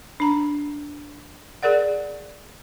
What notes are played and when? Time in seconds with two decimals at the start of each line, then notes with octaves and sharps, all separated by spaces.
0.20 D4 A#5
1.63 G#4 A#4 D5 F#5